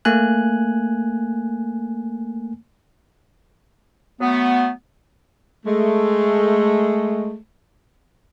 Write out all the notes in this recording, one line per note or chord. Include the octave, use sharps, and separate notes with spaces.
A3 A#3 G#5 F#6
F#3 A3 B3
G#3 A3